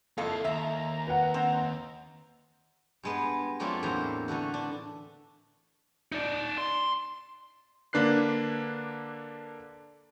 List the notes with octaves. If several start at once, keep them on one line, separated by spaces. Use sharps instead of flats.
F2 A#3 E4 A4 F5
D#2 E5 A#5
B4 F#5
C4
G2 G#3 B3
F#3 A3 A#3 C4 D4 F4
E2 A2 A#3 A4 C5 A#5
D3 E3 A3 F#4
D4
D#4 D5
C6
D3 A#3 D4 B4 F#6 C7